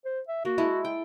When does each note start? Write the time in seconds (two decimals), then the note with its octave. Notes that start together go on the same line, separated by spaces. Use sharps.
0.05 C5
0.28 E5
0.45 A#3 F#4
0.58 G#3 E4 A4
0.85 G5